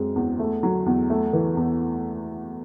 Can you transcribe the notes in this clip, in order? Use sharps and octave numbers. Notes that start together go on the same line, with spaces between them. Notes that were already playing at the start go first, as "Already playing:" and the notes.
Already playing: F#2 G#3 C4
E2
A3
F#3
E2
A3
E3
E2